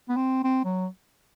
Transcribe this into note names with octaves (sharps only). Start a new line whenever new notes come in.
B3
C4
C4
F#3